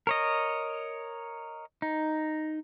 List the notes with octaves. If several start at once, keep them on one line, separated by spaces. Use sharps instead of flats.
A#4 C#5 D#5
D#4